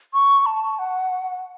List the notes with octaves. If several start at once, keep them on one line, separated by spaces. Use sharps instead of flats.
C#6
A5
F#5